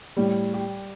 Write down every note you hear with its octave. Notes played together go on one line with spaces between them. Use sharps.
A2 G3
G4